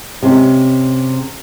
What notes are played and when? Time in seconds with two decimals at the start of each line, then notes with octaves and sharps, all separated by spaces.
0.23 C3 G#3 C#4